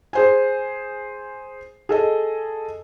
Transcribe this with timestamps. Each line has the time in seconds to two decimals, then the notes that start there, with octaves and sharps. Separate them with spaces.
0.13 G#4 C5 G#5
1.89 G#4 A4 D#5